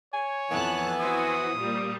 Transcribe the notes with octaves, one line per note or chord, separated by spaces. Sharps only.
C#5 G#5
F2 E3 B3 A5 F#6
E4 F#4 C5 D#6
A#2 G3